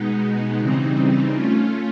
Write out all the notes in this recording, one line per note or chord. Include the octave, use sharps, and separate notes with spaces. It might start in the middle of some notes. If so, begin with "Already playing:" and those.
Already playing: B2 G#3 B3 D#4
C#3 E3 G3 C4 D#4
A3 C#4 F4